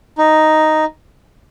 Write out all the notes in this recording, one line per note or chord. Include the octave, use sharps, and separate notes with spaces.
D#4